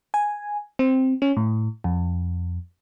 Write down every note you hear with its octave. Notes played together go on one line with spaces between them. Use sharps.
G#5
C4
C#4
A2
F2